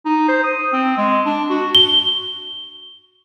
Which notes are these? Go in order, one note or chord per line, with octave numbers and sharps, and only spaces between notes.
D#4
C5
D#6
C4
G#3
D4
F#4
G7